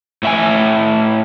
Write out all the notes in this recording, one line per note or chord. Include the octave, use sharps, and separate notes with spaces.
A2 E5 G#5